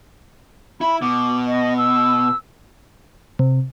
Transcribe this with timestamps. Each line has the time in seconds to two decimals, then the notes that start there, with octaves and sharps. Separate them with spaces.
0.81 E4 B5
1.02 B2 D6
1.47 D#5
1.77 E6
3.39 C3